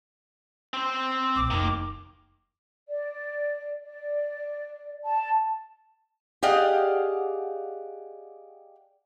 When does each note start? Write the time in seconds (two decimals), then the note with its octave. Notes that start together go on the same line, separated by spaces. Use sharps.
0.74 C4 C5
1.36 B1 A#2 D6
1.51 F1 D#3 A#3 D#4
2.86 D5
3.82 D5
5.05 A5
6.43 G4 G#4 D5 D#5 F5 F#5